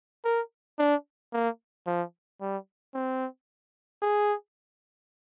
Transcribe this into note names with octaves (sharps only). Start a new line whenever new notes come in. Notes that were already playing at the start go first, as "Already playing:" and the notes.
A#4
D4
A#3
F3
G3
C4
G#4